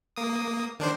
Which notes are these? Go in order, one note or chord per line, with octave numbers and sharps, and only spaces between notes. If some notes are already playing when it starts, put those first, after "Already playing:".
A#3 D#6
D#3 D4 C5